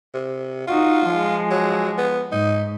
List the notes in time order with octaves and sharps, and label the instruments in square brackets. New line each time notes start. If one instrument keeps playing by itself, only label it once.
[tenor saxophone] C3
[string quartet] D#4 F#4 [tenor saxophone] F4
[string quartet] F3 G#3
[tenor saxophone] F#3
B3
[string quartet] G#2 [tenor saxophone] D#4